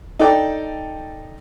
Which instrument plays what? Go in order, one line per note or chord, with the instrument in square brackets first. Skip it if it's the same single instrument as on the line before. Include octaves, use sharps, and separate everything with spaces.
[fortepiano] D#4 A4 D5 G5